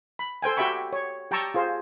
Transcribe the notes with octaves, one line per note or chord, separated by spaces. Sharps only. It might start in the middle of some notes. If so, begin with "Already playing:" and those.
B5
A4 C5 G5 G#5
F#4 G4 E5 G5 B5 C#6
C#5
G4 G5 A5 A#5 C#6 E6
F4 G#4 C5